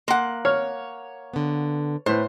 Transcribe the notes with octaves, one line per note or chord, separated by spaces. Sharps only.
A#3 F#5 C6
C#5 F6
D3 B3
A2 B4 C5